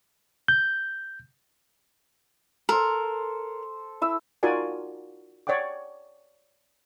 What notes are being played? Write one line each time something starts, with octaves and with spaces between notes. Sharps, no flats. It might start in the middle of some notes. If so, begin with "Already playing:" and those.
G6
A4 A#4 C5
E4 E6
D#4 F4 F#4 A#4 D5 G#5
C#5 D5 F#5 G5 D6